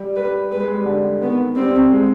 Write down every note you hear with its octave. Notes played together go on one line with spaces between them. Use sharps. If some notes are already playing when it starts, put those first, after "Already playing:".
Already playing: G3
G3 B4
G#3 B4
G#3
G3
D3
D#3 B3
G3 C4
G#3